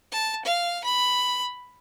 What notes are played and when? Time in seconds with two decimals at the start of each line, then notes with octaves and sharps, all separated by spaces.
0.12 A5
0.45 F5
0.84 B5